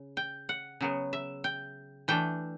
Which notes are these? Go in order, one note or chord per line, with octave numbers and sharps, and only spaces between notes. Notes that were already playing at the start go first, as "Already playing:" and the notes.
Already playing: C#3
G5
F#5
C#3 F#3 B3
E5
G5
E3 A3 D4 G5